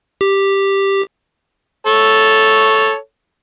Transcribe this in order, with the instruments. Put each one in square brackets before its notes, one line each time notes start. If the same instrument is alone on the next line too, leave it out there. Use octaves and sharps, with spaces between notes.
[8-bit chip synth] G4
[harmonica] A4 C#5